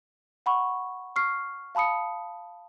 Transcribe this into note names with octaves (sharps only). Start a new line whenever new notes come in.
F#5 B5 C#6
C#6 F6 C7
F5 A5 B5 D#6 C#7